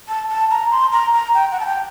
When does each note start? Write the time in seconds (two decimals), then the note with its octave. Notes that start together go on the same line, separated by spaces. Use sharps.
0.09 A5
0.30 A5
0.51 A#5
0.71 C6
0.92 A#5
1.14 A#5
1.34 G5
1.52 F#5
1.60 A5
1.66 G5